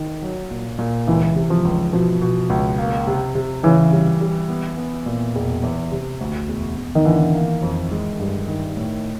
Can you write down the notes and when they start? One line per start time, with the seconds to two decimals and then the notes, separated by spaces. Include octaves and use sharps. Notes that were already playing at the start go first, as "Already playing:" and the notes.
Already playing: D#3
0.22 F#3
0.51 A#2
0.78 A#2
1.07 C#2 E3
1.36 C3
1.50 F3
1.65 C#2
1.93 B2 F3
2.21 B2
2.50 C#2
2.78 A#3
3.07 C3
3.35 C3
3.63 C#3 E3
3.92 G3
4.21 G3
4.49 B3
4.77 B3
5.06 A#2
5.35 E1
5.63 E2
5.92 C3
6.20 D2
6.48 E1
6.77 E1
6.95 D#3
7.05 D3 E3
7.34 A#3
7.62 F2
7.91 G#3
8.19 G2
8.48 D#3
8.77 A2